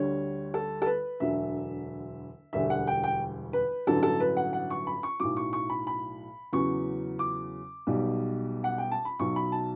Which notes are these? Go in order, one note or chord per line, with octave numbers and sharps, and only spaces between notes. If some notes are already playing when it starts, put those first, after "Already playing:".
Already playing: D2 D3 G3 C#5
A4
A4
B4
E1 D2 D3 F#3 E5
E1 D2 D3 G3 E5
F#5
G5
G5
B4
A1 G2 D3 F#3 A4
A4
B4
F#5
F#5
C#6
B5
C#6
B1 A2 F#3 D6
C#6
C#6
B5
B5
E2 C#3 F#3 C#6
D6
B1 B2 G3
F#5
G5
A5
B5
B1 B2 F#3 C#6
B5
A5